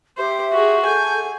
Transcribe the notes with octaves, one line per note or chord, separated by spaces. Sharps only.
G4 C5 E5
F#4 G#4
A4 F#5 G#5 G6